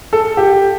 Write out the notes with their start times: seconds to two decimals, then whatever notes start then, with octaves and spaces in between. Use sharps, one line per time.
0.13 A4
0.37 G4